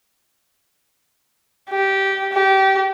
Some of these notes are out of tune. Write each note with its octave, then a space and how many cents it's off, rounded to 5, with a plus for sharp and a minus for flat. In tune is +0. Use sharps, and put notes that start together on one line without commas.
G4 -15
G4 -25